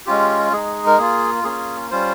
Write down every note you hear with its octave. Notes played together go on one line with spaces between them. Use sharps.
G#3 C#4 F4 G4
G#3 D#4 G#4
A#4
A#3 F4 G#4
A#3 C#4 F4 G#4
G3 C#4 F4 C5